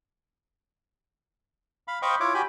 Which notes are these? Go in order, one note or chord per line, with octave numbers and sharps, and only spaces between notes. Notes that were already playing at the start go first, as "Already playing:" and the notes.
F5 B5
C5 D#5 F5 G5 B5 C#6
E4 F4 C#5 D6
F#4 G4 G5 G#5 B5